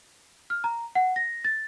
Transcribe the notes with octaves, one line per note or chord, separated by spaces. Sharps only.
F6
A#5
F#5
A#6
A6